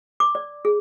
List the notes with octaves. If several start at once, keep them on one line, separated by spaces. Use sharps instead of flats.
D6
D5
G#4